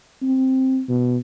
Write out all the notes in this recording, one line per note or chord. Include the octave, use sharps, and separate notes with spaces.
C4
B2